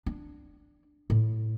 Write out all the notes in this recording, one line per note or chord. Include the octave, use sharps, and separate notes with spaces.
D4
A2